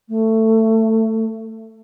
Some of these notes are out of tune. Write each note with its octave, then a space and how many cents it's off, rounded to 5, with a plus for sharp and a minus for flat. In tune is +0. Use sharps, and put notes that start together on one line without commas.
A3 +15